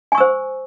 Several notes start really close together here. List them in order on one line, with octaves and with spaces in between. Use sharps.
G#5 C#6 E6 C5